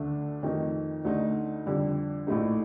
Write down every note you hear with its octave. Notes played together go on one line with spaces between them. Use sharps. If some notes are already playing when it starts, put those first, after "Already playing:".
Already playing: D2 D3 A3 D4
F2 D#3 A3 D#4
D2 D3 A3 D#4
F2 D3 G3
A#1 A2 A3 D#4